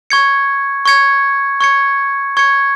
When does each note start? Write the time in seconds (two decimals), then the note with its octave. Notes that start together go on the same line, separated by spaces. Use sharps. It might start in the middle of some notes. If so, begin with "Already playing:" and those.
0.10 C#6 G#6 C#7
0.86 C#6 G#6 C#7
1.61 C#6 G#6 C#7
2.37 C#6 G#6 C#7